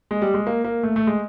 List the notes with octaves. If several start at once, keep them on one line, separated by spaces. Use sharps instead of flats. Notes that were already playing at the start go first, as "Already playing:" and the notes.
G#3
G3
G#3
A#3
A#3
A3
A3
G#3